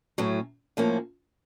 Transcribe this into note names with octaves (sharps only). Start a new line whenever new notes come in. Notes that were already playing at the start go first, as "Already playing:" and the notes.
A2 F#3 A3 C#4
A2 F3 A#3 C#4